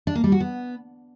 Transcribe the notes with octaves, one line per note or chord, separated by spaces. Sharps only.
D4
A#3
G3
F#4
B3